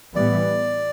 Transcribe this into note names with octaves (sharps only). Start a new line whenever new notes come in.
A2 E3 G3 B3 D5